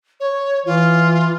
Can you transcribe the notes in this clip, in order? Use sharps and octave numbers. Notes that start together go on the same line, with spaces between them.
C#5
E3 F4